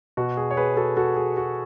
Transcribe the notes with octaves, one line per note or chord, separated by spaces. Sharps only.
B2 F#4
G#4
C#5
G#4 B4
F#4 A4
F#4 A4
G#4
F#4